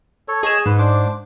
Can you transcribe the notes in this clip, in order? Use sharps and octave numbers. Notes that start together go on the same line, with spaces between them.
A4 C#5
G#4 C#5 D#5 G#5 E7
G#2 B4
D4 C5 D6